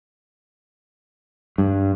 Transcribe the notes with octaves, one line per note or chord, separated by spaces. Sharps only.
G2